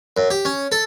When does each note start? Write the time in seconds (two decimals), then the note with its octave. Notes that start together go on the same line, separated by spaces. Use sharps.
0.17 F#2
0.30 G4
0.45 C#4
0.72 A4